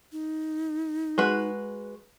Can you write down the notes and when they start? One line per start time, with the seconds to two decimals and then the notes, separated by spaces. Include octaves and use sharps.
0.12 D#4
1.18 G#3 F#4 B4